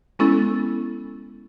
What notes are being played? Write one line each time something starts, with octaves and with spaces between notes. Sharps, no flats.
G#3 B3 C#4 E4 A4 A6